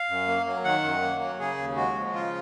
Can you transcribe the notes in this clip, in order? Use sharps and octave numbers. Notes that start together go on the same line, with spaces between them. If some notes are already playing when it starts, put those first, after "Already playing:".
Already playing: F5
F#2
A#3
F#3
D#3 F#5
F#2
A#3
F#3
C#3 G#4
D#2
G#3 F#4
F3
C#3 F4